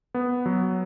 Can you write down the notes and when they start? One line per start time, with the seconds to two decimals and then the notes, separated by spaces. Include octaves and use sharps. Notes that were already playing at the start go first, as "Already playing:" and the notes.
0.14 B3
0.46 F#3